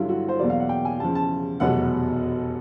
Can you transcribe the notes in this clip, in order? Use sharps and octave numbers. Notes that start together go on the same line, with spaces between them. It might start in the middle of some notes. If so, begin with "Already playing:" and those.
Already playing: G2 D3 F#3 E4 F4
F#4
C5
E2 B2 F#3 A#3 D5
F5
F#5
G5
G#5
E2 C#3 F3 A5
A5
F1 E2 B2 F#3 B3 F#5